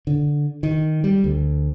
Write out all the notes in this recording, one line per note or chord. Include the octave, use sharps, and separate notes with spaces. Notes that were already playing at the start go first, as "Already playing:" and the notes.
D3
D#3
G3
D2